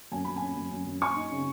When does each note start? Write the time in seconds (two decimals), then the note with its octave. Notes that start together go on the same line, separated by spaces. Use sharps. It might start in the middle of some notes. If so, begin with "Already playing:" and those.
0.12 F#2 G#5
0.24 F#2 B5
0.36 G#5
0.42 C#4
0.56 F#2
0.72 F#2
0.87 F#2
1.01 F#3 G#5 C#6
1.16 D#4
1.32 C#3